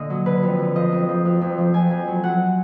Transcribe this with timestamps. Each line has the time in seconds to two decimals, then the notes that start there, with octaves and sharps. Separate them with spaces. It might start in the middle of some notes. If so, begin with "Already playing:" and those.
Already playing: A#2 D3 D#5
0.10 F#3
0.26 D3 B4
0.43 F2
0.59 D3
0.75 F3 D#5
0.92 F2
1.08 F3
1.25 F2
1.41 F2
1.58 F3
1.74 F2 G#5
1.91 F2
2.08 F#3
2.24 F#3 F#5